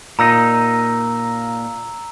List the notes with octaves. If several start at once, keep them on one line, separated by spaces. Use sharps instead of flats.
A#2 D#4 A#5 E6